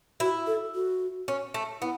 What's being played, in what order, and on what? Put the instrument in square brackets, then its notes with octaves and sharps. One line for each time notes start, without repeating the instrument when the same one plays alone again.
[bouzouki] E4 [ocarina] F#4
[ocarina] A4
F#4
[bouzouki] C#4
A3
[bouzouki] B3 [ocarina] E4